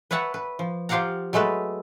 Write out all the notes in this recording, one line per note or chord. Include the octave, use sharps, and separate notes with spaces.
B4 C#5 E5 F#5 A5
B4
F3
F3 F4 G4 F5 F#5 A#5
F#3 G#3 A3 A4 B4